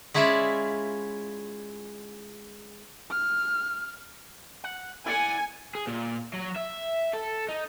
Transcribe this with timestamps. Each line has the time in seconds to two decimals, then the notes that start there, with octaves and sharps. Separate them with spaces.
0.14 G#3 C#4 E4 F4 D5 E5
3.11 F6
4.64 F#5
5.06 E4 D5 F#5 G#5
5.75 G#4
5.87 A#2
6.34 F#3
6.56 E5
7.13 A4
7.49 D#4